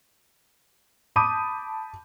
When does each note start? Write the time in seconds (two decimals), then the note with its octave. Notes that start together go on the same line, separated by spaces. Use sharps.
1.16 A5 B5 D6 D#6 G6 D#7